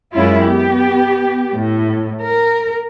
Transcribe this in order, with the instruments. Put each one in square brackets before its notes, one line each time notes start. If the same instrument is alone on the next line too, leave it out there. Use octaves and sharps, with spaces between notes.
[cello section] F#2 G#3 C#4 E4 F4
B3 G4
A2
A#4